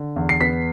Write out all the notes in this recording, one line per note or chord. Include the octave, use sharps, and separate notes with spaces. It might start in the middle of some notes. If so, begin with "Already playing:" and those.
Already playing: D3
E2
C7
B3 B6